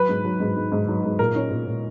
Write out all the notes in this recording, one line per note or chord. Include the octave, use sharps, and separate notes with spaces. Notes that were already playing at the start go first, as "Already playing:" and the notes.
Already playing: F#3 B4
G#2
F#3
G#2
G#2
G#2
F#3
G#2
A#2 A#4
C#4
A#2
A#2